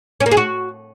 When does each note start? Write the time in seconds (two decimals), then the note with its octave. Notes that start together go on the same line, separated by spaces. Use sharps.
0.20 C#4
0.26 A#3
0.31 G#4
0.37 F#4